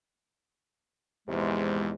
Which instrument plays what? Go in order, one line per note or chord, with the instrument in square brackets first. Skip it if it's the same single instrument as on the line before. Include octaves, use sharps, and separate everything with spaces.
[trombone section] A#1 E2 [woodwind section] G#2 C3 G#3